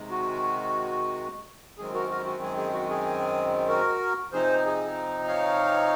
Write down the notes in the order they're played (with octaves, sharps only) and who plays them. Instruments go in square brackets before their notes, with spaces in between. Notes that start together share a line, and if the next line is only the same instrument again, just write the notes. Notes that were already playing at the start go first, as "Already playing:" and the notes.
Already playing: [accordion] C3 D#3 G#3
F#4
F#2 D#3 G#3 C4 G#4
F#4 A#4
F#4 A#4
F#4
G#4
G#4
F#4
G#4
F#4 A#4
C3 F3 C4 D#4 G#4 C5
G#4
C#5 F5